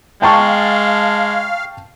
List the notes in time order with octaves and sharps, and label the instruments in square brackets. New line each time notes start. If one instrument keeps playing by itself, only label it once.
[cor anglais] G#3 [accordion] F5 [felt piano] G5 A5 C#6